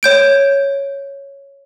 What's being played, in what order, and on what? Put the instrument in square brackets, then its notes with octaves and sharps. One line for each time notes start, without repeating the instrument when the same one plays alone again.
[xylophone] C#5 G6 D7